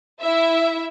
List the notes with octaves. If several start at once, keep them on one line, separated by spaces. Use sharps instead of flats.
E4 E5